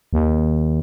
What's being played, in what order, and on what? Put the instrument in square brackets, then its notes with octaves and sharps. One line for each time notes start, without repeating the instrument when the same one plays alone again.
[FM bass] D#2